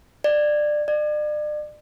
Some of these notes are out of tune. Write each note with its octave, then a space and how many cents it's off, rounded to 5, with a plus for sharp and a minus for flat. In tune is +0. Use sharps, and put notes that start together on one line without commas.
D5 +20
D5 +40